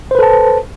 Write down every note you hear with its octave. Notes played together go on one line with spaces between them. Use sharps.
A4 B4 C5 A5